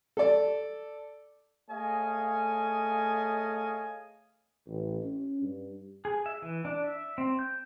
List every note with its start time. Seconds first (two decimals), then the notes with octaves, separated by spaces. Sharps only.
0.17 A4 D5
1.71 A3 G#4 C#5 D#5 F5 G#5
4.67 A1
5.03 C#4
5.42 G2
6.05 G#4
6.26 E5
6.42 E3
6.65 D4
6.84 E5
7.18 C4
7.39 G6